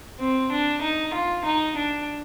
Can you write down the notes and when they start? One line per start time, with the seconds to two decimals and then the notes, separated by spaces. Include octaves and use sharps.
0.19 C4
0.51 D4
0.81 D#4
1.13 F4
1.44 D#4
1.76 D4